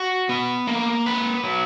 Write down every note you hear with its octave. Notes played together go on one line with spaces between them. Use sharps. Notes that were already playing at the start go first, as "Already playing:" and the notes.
Already playing: F#4
B3
A#3
B4
F#3